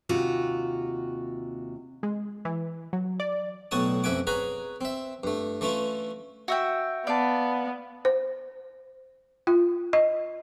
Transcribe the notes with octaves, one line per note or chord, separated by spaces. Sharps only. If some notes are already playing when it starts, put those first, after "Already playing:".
D#2 C3 F4 F#4
G#3
E3
F#3
D5
B1 A2 F#4 C#5 A5 D#6
A1 F2 E5 F#5 G#5 D6
G#4 B4 C#5 F#5 G#5 A#5
C4 E5
G2 A3
E3 A3 C#4 E4 F4
F#4 E5 G5
B3 D5 F5 A5
C5
F4
D#5